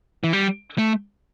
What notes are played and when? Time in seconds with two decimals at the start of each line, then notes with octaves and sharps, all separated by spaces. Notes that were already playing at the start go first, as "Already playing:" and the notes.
0.24 E3
0.33 G3
0.78 A3